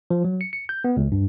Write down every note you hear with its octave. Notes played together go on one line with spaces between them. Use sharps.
F3
F#3
C#7
C#7
G6
B3
C#2
G2